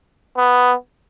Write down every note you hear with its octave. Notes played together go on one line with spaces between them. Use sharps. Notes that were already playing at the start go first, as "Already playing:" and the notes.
B3